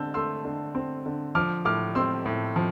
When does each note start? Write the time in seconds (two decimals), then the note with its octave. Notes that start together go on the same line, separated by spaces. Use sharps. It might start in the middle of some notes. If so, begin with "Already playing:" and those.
Already playing: D3 C4 A5 E6 G6
0.14 A3 C6 E6
0.45 D3
0.75 C4
1.06 D3
1.35 F3 D6 F6
1.65 A2 D6 F6
1.95 C4 C6 E6
2.26 A2
2.56 F3